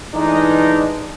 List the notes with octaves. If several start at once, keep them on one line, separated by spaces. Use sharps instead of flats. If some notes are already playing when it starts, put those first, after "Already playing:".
E3 G#3 A3 D4 D#4